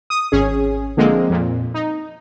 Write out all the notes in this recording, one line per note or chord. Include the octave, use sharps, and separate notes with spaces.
D#6
G#1 C#4 G#4
D3 F3 G#3 A#3 C4
F2 A#2
D#4